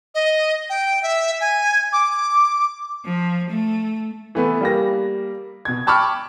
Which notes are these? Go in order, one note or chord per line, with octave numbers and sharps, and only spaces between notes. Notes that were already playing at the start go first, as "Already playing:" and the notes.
D#5
G5
E5
G#5
D6
F3
A3
E3 A3 B3
G3 A#3 A#6
B2 G#6
G5 A5 B5 C#6 D6 F6